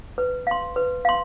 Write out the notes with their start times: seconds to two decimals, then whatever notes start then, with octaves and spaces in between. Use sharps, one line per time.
0.18 B4
0.47 F5 C6
0.76 B4
1.05 F5 C6